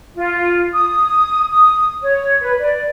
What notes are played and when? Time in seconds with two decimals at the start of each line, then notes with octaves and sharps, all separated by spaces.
0.15 F4
0.73 D#6
1.51 D#6
2.01 C#5
2.40 B4
2.58 D5